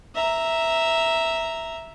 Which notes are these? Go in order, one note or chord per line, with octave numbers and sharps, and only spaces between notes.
E5 A#5